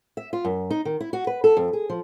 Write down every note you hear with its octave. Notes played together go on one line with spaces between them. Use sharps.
E5
F4
F#2
D#4
D#3
E4
F#4
B4
A4
F2
G#4
F3